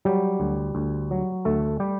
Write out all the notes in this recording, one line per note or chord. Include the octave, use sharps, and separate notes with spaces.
F#3 G3 G4
D2
D2
F#3
D2 A3 A4
G3 G4